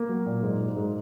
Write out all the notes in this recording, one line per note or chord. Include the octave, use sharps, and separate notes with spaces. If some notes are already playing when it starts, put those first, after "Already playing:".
Already playing: A#3
F#3
A#2
G#2
G#2
G#2